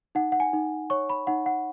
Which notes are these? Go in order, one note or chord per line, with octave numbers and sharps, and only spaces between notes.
D#4 F#5
F#5
G#5
D#4
C#5 C#6
B5
D#4 F#5
F#5